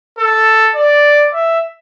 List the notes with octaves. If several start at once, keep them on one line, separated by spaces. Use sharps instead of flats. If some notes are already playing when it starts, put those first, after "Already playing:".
A4
D5
E5